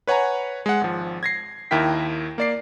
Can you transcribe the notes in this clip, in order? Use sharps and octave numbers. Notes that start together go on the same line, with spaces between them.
B4 C#5 F#5 G#5 A#5
G#3 F#5
G#1 F3
G#6 A#6 C7
D#2 D#3 E4 A#4 G5 B6
A#3 D5 C7